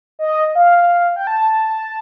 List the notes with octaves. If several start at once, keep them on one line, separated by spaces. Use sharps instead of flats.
D#5
F5
G5
A5